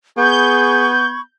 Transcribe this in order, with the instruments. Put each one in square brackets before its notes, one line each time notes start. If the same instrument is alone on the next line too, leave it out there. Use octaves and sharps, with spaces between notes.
[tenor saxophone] B3 [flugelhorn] G#4 [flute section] B5 C#6 G#6 [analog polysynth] G6